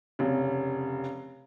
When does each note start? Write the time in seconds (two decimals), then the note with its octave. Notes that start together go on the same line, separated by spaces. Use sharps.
0.19 F1 C#3